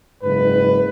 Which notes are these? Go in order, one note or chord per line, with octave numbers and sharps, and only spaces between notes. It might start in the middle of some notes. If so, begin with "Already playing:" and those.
F#1 G#2 B4